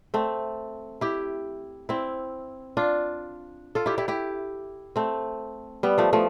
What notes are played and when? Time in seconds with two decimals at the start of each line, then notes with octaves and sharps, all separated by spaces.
0.14 A3 C4
1.01 E4 G4
1.89 C4 E4
2.77 D4 F4
3.75 F4 A4
3.86 E4 G4
3.98 E4 G4
4.08 E4 G4
4.96 A3 C4
5.83 G3 B3
5.98 F3 A3
6.13 F3 A3